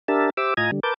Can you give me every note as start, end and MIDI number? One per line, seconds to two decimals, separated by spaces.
0.08 0.30 62
0.08 0.30 67
0.08 0.30 70
0.08 0.30 76
0.08 0.30 81
0.37 0.54 67
0.37 0.54 72
0.37 0.54 76
0.37 0.54 86
0.37 0.54 88
0.57 0.71 45
0.57 0.71 65
0.57 0.71 75
0.57 0.71 80
0.57 0.71 82
0.57 0.71 92
0.72 0.80 50
0.72 0.80 55
0.83 0.94 70
0.83 0.94 71
0.83 0.94 81
0.83 0.94 86
0.83 0.94 91